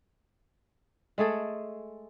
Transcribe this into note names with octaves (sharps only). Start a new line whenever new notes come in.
G#3 A3 G#4 A4